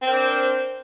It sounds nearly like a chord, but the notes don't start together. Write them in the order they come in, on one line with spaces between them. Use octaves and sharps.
C4 C5 A#4 D4